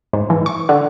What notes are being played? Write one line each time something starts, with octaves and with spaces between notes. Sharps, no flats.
G#2
E3
C#6
D3